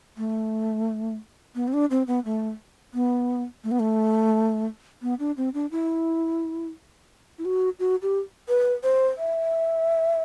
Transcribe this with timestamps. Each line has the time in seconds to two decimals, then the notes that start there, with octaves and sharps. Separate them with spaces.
0.17 A3
1.55 B3
1.68 C4
1.73 D4
1.91 C4
2.07 B3
2.25 A3
2.94 B3
3.64 A3
3.71 B3
3.80 A3
5.02 B3
5.19 D4
5.37 C4
5.54 D4
5.71 E4
7.39 E4
7.45 F#4
7.80 F#4
8.02 G4
8.49 B4
8.83 C5
9.18 E5